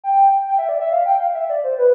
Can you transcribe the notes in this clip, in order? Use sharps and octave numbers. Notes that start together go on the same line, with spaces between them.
G5
G5
E5
D5
E5
F5
G5
F5
F5
E5
D5
C5
B4